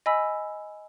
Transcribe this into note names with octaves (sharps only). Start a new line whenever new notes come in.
D#5 G#5 B5 E6 B6